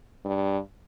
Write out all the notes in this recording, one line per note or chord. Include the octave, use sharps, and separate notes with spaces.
G2